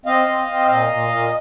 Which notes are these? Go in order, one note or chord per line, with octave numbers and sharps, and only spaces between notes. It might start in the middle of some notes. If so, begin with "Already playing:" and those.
C4 D#5 F5
C4
C4
A#2 D#5 F5
A#2
A#2